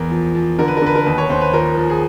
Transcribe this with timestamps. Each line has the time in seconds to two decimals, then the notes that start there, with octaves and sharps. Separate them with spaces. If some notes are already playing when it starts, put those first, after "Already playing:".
Already playing: E2 A#4
0.11 F3
0.35 F3
0.59 D3 A#4
0.68 B4
0.77 A#4
0.82 D3 B4
0.95 A#4
1.06 D#2 B4
1.18 C#5
1.30 D#2 C5
1.41 B4
1.53 F3 A#4
1.78 F3
1.90 G#4